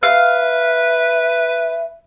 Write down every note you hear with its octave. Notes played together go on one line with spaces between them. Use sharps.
B4 E5 F5